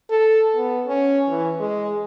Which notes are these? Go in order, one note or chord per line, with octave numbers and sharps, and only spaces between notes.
A4
B3
C#4
E3
G#3